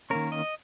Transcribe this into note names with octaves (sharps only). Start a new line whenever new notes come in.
D#3 A#3 C#4 A#4
D#5